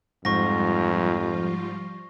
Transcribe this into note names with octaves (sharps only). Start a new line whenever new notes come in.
F2 G#2 F3 G3 F4 C#6 A#6